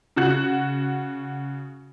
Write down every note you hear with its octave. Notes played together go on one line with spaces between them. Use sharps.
C#3 F#4 F#6